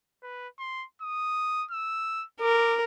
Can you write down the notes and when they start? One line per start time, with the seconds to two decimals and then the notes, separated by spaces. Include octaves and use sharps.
0.22 B4
0.59 C6
1.02 D#6
1.71 E6
2.41 A#4 D6